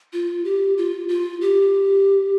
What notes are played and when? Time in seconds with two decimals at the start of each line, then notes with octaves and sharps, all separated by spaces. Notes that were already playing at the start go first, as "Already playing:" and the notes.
0.13 F4
0.45 G4
0.78 F4
1.09 F4
1.41 G4